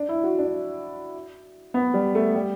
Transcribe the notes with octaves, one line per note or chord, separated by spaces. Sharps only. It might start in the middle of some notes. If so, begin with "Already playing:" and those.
Already playing: D4
E4
F#4
D4
B3
G3
A3
G3